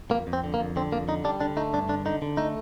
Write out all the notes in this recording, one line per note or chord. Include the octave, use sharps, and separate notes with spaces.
F2 A#3
F2
C4
D3
A#3
F2
D3 C4
F2 A#3
D3 D#4
G3 D4
D3 D4
A3 D#4
G2 D4
D3 D4
D3 D#4
D3
A3 D#4